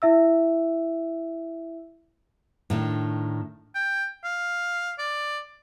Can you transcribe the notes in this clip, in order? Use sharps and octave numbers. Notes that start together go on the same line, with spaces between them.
E4 E5 E6
A2 D#3 D4
G5
F5
D5